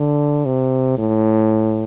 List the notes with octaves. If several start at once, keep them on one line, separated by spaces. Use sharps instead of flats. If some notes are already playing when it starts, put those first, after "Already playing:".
Already playing: D3
C3
A2